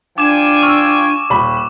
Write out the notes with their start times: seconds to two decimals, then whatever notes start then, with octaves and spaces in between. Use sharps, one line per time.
0.18 F3 D4 G5 G#5 D6 E7
0.63 C#6 E6 F6
1.30 D#1 B5